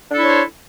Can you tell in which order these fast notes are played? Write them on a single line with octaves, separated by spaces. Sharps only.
D4 A4 E4 C#5 C5